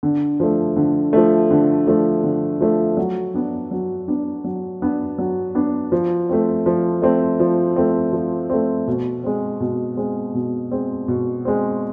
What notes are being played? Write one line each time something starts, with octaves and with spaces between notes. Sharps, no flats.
D3
F3 A3
D3
F3 A3
D3
F3 A3
D3
F3 A3
F#3
B3 D4
F#3
B3 D4
F#3
B3 D4
F#3
B3 D4
F3
A3 C4
F3
A3 C4
F3
A3 C4
F3
A3 C4
B2
G#3 C4
B2
G#3 C4
B2
G#3 C4
B2
G#3 C4